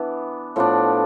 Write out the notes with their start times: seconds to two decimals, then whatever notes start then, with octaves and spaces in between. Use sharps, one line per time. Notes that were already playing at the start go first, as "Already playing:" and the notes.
Already playing: E3 B3 D4
0.56 A2 F3 B3 D4